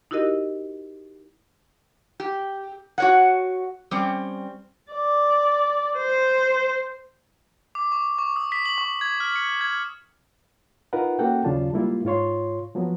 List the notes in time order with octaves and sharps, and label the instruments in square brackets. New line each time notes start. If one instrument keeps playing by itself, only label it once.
[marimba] D#4 E4 F#4 G4 A#4 D#5
[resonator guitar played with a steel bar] G4
F#4 C#5 F#5
G3 C4 C#4
[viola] D5
C5
[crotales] D6
C#6
C#6
D#6
B6
F#7
C#6
G#6
F6
C#7
G#6
[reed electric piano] D#4 F4 A#4 B4 F#5
A#3 C#4 F#4 A4 F#5 G5
D#2 C#3 F#3 D4 F4 A5
G3 G#3 A#3 E4 F4
G#2 F4 C#5 C6
F3 F#3 B3